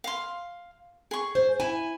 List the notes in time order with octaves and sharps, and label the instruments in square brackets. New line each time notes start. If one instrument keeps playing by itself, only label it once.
[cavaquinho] F5 C6
G#4 C#6
[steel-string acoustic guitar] C5
[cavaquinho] E4 [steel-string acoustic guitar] G#5